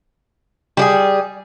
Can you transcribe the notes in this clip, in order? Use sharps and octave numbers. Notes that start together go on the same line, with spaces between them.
G3 G4 G#4